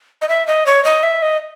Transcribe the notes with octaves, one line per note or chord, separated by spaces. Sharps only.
D#5
E5
D#5
C#5
D#5
E5
D#5